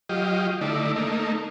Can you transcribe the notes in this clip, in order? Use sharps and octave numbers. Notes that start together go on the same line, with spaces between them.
F#3 F4 G4 D#5
D3 A3 D#4 E4 D5
A3 A#3 D#4